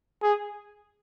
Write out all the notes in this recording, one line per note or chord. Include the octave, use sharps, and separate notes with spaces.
G#4